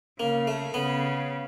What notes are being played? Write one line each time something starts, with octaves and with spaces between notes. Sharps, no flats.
C#3 A#3
A3
C#3 B3